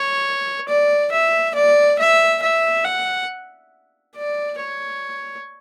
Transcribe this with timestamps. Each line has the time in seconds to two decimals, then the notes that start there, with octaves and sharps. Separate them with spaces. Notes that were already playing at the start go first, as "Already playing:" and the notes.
Already playing: C#5
0.68 D5
1.12 E5
1.55 D5
1.99 E5
2.43 E5
2.85 F#5
4.16 D5
4.59 C#5